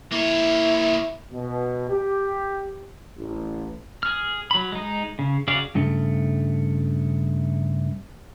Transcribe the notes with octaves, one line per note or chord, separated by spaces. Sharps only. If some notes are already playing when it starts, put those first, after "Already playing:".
A#3 E4 C#5
B2
G4
A1
G#4 F6
F#3 B5
G#3 D#4
C#3
C#3 F#4 G#4 D5 F5
G2 C#3 A3